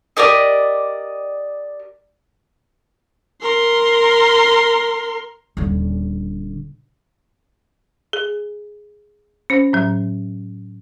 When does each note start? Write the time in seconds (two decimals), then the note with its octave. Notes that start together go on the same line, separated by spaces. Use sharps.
0.17 G4 A#4 D5 D#5
3.42 A#4 C6
5.57 D#1 D3
8.13 G#4
9.50 C#4 C5
9.73 A2 F#3